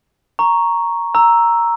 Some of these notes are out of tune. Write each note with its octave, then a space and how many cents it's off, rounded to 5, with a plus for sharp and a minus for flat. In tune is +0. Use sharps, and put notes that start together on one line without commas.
A#5 +0 C#6 +0
A#5 +0 E6 +0